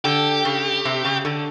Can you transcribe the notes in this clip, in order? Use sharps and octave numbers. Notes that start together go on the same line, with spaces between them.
D3 G4
C#3
C3
C#3
D3